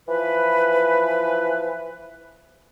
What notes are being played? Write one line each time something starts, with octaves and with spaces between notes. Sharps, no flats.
E3 F3 B4